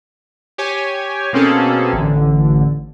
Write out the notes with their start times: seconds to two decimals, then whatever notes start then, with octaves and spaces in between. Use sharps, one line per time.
0.58 G4 C#5 G#5
1.33 B2 A#3 C4 C#4 G#4 A4
1.93 A1 D3